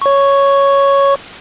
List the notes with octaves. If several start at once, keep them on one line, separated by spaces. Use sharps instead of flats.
C#5 C#6